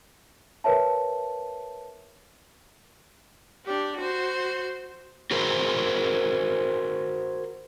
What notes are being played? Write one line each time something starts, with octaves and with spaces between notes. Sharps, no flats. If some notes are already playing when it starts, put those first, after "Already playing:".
A#4 B4 C#5 E5 A5
D4 G4
F#4 C5
F#4 G#4 A#4 C5